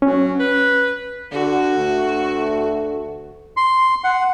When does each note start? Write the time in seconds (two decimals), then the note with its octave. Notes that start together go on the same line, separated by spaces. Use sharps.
0.02 F#3 C#4
0.39 B4
1.32 D3 F#4
1.78 D2 A3
3.57 C6
4.04 F#5